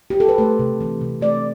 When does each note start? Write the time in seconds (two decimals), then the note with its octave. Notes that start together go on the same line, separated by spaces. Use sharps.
0.10 G4
0.20 A4
0.29 B4
0.38 A3 C5
0.59 C3
0.81 E3
1.01 C3
1.21 A3 D5